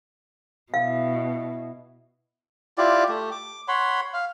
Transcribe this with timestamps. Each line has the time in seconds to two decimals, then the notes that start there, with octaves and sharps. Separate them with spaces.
0.74 B2 E4 F5
2.78 E4 F4 G4 D5
3.09 A3 G4
3.31 D6
3.68 C#5 F#5 B5 C6
4.14 F5